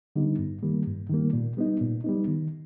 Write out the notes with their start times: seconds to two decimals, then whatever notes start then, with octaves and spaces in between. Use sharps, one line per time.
0.16 D3 G3 B3 D#4
0.39 G2
0.63 D#3 G3 A#3
0.87 G2
1.10 D#3 G3 A#3
1.33 A#2
1.57 G3 B3 D#4
1.81 A#2
2.04 G3 B3 D#4
2.28 D#3